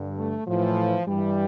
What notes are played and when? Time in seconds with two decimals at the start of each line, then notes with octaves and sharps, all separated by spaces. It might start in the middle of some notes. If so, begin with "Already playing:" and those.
Already playing: G2 D3
0.18 A3
0.47 A2 E3 F3
1.07 G2 E3 G3